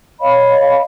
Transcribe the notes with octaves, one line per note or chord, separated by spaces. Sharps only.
C#5 D#5 F5 B5